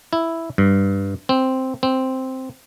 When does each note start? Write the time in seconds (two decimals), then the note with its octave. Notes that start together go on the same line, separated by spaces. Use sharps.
0.13 E4
0.58 G2
1.29 C4
1.83 C4